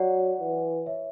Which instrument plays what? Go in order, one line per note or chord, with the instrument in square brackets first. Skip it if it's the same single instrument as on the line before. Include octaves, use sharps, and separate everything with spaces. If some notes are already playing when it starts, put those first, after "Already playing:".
Already playing: [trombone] F#3 [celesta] D5 F#5
[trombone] E3
[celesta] C#5 E5